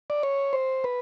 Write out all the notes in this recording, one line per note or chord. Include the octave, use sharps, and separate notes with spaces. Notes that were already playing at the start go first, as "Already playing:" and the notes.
D5
C#5
C5
B4